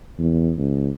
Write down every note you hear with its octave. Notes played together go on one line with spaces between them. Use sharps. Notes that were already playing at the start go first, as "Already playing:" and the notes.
E2
C#2